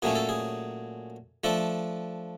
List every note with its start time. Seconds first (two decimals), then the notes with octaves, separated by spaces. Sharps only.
0.02 A#2 F#3 A3 C#4 G#4
0.15 A4
0.29 G#4
1.44 F3 A3 D4 A4